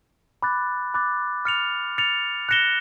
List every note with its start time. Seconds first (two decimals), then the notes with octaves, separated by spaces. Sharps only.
0.42 B5 D6 F#6 A6
0.94 B5 D6 F#6 A6
1.45 F6 A6 C#7 F7
1.98 F6 A6 C#7 F7
2.49 F#6 A#6 C#7 E7 G7